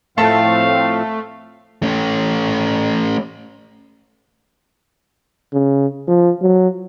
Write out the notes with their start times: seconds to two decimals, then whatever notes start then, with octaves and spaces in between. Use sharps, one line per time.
0.18 A2 F3 A3 C4 A4 F5 A5
1.83 A3 C#4
5.53 C#3
6.08 F3
6.42 F#3